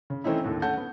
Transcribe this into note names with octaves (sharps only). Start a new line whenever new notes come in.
C#3
E3 A3 C4 C#4 D#4 E4
D#2 A2 D3 A3
A3 C#4 F#5 A5 G6
B3